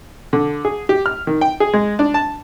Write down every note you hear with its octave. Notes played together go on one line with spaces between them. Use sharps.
D3
G#4
G4
F6
D#3
G5
G#4
G#3
D4
A5